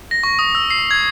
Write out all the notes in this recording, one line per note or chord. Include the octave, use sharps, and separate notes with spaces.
A#6
C#6
D#6
E6
C7
G#6